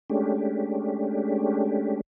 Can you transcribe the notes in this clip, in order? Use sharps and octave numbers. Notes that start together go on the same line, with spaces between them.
G#3 A3 C#4 D4 G4